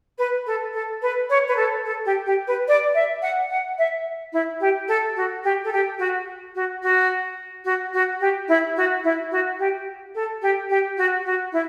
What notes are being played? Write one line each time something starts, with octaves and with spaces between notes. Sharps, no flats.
B4
A4
A4
B4
C#5
B4
A4
A4
G4
G4
B4
D5
E5
F#5
F#5
E5
E4
G4
A4
F#4
G4
A4
G4
F#4
F#4
F#4
F#4
F#4
G4
E4
F#4
E4
F#4
G4
A4
G4
G4
F#4
F#4
E4